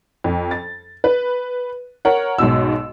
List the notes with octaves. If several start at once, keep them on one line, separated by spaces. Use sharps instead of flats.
F2
A6
B4
A#4 C#5 F#5
B1 G#2 B2 E6